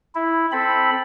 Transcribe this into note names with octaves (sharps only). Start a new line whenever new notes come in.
E4
C4 A4 B5